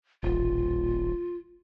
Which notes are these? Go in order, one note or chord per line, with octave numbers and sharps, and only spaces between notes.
D#1 A1 F4